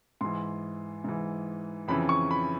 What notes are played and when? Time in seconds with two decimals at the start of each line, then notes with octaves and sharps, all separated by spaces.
0.21 G#2 E3 C6
1.04 G#2 E3
1.88 F2 C#3 E3 B5
2.09 C#6
2.31 B5